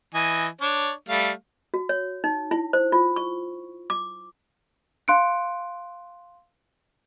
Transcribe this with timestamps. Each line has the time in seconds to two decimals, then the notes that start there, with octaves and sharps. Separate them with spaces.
0.14 E3 D#5 G#5
0.61 D4 C#5
1.09 G3 A3 F5
1.74 F#4
1.89 C#5
2.24 D#4
2.51 E4
2.73 C5
2.92 F4
3.16 C#6
3.90 D6
5.08 F5 C6 F#6 C#7 D7